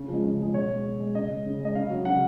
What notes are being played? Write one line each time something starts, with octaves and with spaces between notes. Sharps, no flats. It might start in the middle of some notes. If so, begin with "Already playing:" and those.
Already playing: C#3
F3 G#3
C#3
F3 G#3
B2 C#5
G#3
B2
G#3
C#3 D#5
G#3
C#3
G#3
D#5
C#3 F5
F#3
C#3 F#5